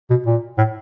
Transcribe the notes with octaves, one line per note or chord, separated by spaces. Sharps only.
B2
A#2
A2